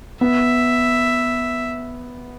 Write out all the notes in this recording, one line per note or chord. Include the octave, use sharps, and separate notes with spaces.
B3 E5